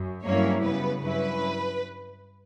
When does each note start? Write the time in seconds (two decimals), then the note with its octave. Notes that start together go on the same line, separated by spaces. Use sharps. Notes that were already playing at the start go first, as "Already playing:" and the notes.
Already playing: F#2
0.25 G2 F#3 A#3 C#4 E4 C#5
0.63 F#2 C#3 G3 B3 B4
1.02 G2 F#3 C#4 E4 B4